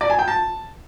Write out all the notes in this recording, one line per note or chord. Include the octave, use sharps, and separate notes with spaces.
D5
G#5
G5
A5